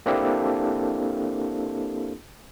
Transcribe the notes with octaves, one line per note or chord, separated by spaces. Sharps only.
A#3 C4 D4 E4 G4 A4